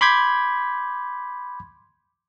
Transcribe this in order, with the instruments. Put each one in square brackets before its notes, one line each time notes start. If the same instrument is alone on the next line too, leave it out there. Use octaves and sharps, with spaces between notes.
[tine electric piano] B5 C6 D6 G6 G#6 B6